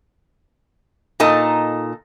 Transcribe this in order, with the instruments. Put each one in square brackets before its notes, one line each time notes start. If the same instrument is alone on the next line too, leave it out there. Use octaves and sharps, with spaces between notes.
[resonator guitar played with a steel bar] A#2 D#4 A4 D#5